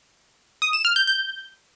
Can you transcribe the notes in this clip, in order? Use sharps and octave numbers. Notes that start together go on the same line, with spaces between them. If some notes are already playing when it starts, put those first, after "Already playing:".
D#6
E7
F6
G6
G6